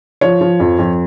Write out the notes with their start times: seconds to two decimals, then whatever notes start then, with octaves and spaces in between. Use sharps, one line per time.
0.21 F3 C#5
0.41 F3
0.60 F2
0.79 F2